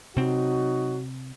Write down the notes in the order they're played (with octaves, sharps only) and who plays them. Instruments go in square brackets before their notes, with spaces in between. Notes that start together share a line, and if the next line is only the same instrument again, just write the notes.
[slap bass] C3 C4 [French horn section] F#3 D#4 F#4